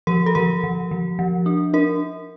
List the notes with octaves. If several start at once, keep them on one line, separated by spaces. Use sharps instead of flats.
F3 A#4
A4
F3 A#4
F3
F3
F3
D4
D4 A#4